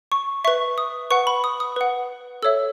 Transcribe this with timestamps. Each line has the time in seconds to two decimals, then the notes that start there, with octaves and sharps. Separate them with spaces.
0.12 C#6
0.44 B4 E5 C#6
0.78 D#6
1.11 B4 F#5 C#6
1.27 B5
1.44 D#6
1.60 D#6
1.76 B4 F#5
2.42 A4 C#5 E5 E6